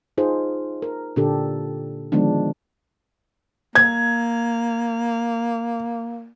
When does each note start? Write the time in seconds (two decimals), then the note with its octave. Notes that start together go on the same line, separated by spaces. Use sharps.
0.18 D#4 F4 G#4 C5
0.82 A#4
1.16 A#2 D3 D4 G4 A4
2.12 D3 D#3 F3 G#3 B3 D4
3.75 A#3 G#6